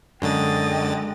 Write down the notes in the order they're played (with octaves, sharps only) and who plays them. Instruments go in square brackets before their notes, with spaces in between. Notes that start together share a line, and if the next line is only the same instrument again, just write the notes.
[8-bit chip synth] F#2 D3 A6 [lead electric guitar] G#3 [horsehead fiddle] D#5 G5